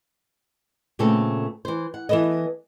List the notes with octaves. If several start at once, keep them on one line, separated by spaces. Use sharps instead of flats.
A#2 C#3 A3 B3 C4 A4
E3 C5
F#5
E3 B3 A4 B4 D#5